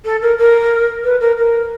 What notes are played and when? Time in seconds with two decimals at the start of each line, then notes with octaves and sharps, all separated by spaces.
0.05 A4
0.22 A#4
0.38 A#4
1.04 B4
1.20 A#4
1.37 A#4